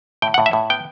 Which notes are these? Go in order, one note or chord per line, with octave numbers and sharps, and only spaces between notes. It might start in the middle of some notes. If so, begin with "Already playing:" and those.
A2 G5
F#5
A2
E5
A2
B3 G5